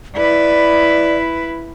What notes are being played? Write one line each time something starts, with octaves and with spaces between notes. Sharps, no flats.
E4 B4 D5